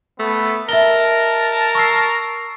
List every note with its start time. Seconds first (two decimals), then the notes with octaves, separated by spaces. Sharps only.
0.20 A3 B3
0.69 A#4 D#5 E5 A5 G7
1.75 C#6 E6 C7